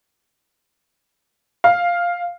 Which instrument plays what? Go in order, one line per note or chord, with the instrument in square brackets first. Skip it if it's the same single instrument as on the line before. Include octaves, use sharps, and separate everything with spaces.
[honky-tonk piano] F5